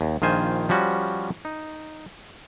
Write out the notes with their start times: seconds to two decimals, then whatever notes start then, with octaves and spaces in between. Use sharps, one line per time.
0.01 D#2
0.22 A#1 D#3 F4 C5 G#5
0.69 F3 G3 C#4 F#4
1.45 D#4